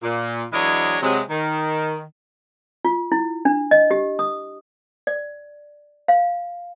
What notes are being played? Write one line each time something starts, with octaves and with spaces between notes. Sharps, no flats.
A#2
E3 F#3 G#3 D4 C#5 D#5
C3 F#3 G#3
D#3
F4
E4
D4
D#5
G4
D#6
D5
F5